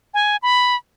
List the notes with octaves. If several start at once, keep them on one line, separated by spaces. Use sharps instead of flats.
G#5
B5